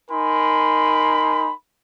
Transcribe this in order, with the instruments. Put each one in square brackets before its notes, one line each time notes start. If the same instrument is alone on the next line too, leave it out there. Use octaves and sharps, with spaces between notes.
[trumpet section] D#4 A#4 G#5 B5 C6